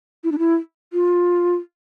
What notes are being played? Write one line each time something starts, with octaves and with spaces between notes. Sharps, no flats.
E4
D4
E4
F4